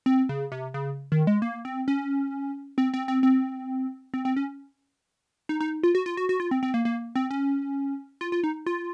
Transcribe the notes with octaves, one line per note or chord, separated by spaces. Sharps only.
C4
C#3
C3
C#3
D#3
G#3
A#3
C4
C#4
C4
C4
C4
C4
C4
C4
C#4
D#4
D#4
F4
F#4
F4
F#4
F#4
F4
C4
C4
A#3
A#3
C4
C#4
F4
F4
D#4
F4